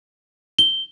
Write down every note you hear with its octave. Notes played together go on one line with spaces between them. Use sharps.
G7